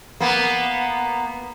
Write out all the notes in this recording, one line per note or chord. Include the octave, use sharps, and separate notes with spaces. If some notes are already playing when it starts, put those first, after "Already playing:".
A#3 B3